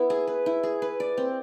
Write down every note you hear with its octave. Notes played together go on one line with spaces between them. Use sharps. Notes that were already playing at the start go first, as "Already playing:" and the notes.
Already playing: B3 E4
G#4
B4
E4
G#4
B4
D5
C4